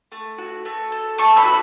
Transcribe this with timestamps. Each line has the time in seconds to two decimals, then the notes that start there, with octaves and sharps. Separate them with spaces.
0.12 A3
0.38 F#4
0.65 A3
0.92 A4
1.18 A3 A5 C#6
1.36 B5 E6
1.45 F#4